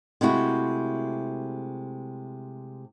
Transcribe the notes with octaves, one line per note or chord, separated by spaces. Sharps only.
C3 G#3 A3 E4 F#4